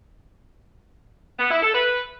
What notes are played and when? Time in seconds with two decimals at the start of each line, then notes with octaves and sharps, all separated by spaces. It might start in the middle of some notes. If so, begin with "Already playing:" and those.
1.39 B3
1.51 E4
1.62 A4
1.74 B4